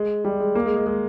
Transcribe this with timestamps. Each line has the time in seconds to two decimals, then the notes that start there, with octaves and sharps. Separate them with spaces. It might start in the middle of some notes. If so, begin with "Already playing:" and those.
Already playing: G#3
0.25 G3
0.40 G#3
0.55 A#3
0.66 G#3
0.76 G#3
0.86 G#3